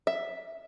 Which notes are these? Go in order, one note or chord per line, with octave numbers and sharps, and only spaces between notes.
E5